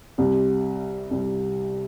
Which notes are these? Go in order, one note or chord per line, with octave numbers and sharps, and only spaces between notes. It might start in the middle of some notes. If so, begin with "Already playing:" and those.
C2 C3 G3
C2 C3 G3